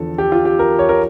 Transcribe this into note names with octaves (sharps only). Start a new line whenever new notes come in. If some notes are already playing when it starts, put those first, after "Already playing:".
Already playing: E2 D3 F3 A4
G4
F4
G4
A#4
C#5
A#4